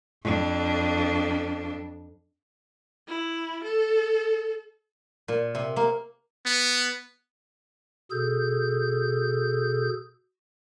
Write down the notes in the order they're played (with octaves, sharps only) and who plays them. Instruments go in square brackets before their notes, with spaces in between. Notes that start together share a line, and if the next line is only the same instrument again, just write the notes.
[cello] F2 D4
[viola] E4
A4
[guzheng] A#2
C3
A#3
[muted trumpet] B3
[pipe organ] B2 G#4 A4 G6